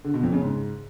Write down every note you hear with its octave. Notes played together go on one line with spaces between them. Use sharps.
D3
B2
F2
C#3
G#2